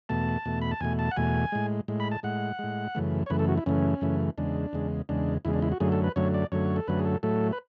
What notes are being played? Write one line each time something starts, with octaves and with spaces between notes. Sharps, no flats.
E2 B2 A3 A5
E2 B2 A3
B5
A5
E2 B2 A3 G#5
A5
F#5
E2 B2 A3 G#5
A2 G#3
A2 G#3
B5
A5
A2 G#3 F#5
A2 G#3
F#2 C#3 E3 A3
C#5
F#2 C#3 E3 A3 B4
A4
F#4
E4
F#2 C#3 E3 A3 C#4
F#2 C#3 E3 A3
E2 C#3 G#3 D4
E2 C#3 G#3
E2 C#3 G#3 D4
E2 C#3 G#3 E4
D4
E4
F#4
F#2 D3 F#3 A3 G#4
A4
B4
F#2 D3 F#3 A3 C#5
D5
F#2 D3 F#3 A3 C#5
A4
F#2 D3 F#3 A3 B4
G#4
A4
A2 F#3 A3 A4
B4